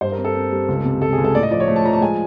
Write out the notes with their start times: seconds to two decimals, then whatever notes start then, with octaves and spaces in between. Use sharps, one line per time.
0.01 G2 C5
0.12 A#4
0.18 C4
0.24 A4
0.35 C4
0.52 G3
0.68 C#2
0.84 C3
1.02 C#2 A4
1.13 G#4
1.18 C#2
1.24 A4
1.35 A2 D5
1.43 D#5
1.51 F3 D5
1.60 C#5
1.68 A3
1.76 A5
1.85 F3 A#5
1.93 A5
2.01 G#3 G#5